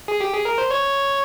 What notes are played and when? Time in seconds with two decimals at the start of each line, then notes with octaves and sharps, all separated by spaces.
0.08 G#4
0.20 G4
0.33 G#4
0.45 A#4
0.58 C5
0.70 C#5